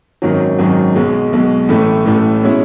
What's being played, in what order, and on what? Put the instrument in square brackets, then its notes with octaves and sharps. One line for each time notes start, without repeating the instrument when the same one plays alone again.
[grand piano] G#1 F#2 D#3 F#3
G#1 F#2 D#3 F#3
B1 B2 G#3
B1 B2 G#3
A1 A2 E3 A3
A1 A2 E3 A3
B2 G#3 C#4 E4